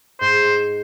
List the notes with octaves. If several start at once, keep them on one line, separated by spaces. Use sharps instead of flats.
G#2 C5